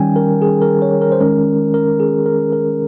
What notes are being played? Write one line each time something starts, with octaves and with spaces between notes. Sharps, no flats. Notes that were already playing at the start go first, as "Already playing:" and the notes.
Already playing: D#3 G3 C#4 G5 G#5
A#4
G#4
A#4
C#5
A#4
C5
D#3 G#3 C#4 A#4
A#4
G#4
A#4
A#4